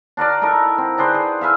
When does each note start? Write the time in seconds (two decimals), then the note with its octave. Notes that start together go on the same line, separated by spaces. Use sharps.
0.17 D4 F#4 A#4 D5
0.42 D#4 E4 A4 A#4
0.78 C4
0.98 D4 G#4 B4 C5
1.15 G#4
1.41 G#4 B4 E5 F5